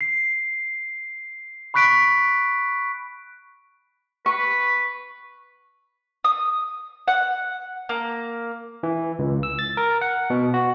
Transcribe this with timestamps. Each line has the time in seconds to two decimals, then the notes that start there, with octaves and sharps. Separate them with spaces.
0.01 C7
1.74 B5 C#6 F#6 B6 D7
4.26 B4 C#6
6.24 D#6
7.08 F#5
7.89 A#3
8.83 E3
9.19 C#2
9.43 E6
9.59 A6
9.77 A#4
10.01 F#5
10.30 B2
10.54 F#4